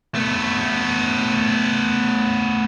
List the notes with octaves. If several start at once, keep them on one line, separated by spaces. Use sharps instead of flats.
A3 B3